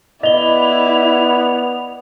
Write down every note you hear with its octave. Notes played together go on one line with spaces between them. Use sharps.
B3 E4 D5 D#5 F7 G7